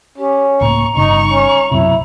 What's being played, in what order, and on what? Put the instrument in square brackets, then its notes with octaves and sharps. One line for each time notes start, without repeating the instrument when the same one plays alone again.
[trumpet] C#4 [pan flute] G4
[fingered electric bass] C#2 A2 A#3 [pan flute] A#5 [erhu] C#6
[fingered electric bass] G1 G2 C#3 [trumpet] D#4 [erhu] C#6
[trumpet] C#4
[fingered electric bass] B1 F#2 C3 [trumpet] E4